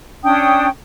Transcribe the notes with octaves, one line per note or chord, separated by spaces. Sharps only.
C#4 D4 G5 D#6